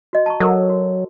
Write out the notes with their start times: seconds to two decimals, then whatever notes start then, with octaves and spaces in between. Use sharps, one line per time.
0.13 F#4 D#5
0.26 A5 A#5 C#6
0.40 F#3 A4 A#4
0.70 F#4